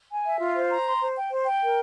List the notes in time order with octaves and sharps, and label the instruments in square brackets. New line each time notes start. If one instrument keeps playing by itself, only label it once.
[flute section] G#5
E5
F4
C5
A#5
C6
C5
G5
C5
G5
A#4